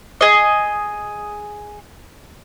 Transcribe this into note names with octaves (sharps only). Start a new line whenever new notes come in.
G#4 D#5